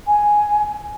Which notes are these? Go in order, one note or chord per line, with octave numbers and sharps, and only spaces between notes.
G#5